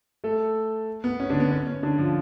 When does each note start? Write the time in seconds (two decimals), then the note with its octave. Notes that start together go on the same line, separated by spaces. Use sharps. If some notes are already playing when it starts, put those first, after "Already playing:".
0.24 A3 A4
1.04 B3
1.20 C#4
1.30 D3 D4
1.40 B3
1.51 C#4
1.67 C#4
1.83 D3 D4
1.98 F3 F4